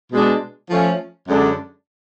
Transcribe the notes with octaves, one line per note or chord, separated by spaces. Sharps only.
B2 G#3 D4
F3 A3 C#4
F#2 D3 G#3 D4